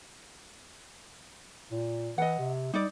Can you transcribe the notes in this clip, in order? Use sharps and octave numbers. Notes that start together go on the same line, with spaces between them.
A#2
E3 D#5 F#5
C3
G3 D#4 D5